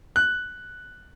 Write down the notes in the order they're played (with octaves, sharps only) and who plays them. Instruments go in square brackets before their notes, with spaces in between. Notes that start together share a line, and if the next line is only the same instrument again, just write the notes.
[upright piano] F#6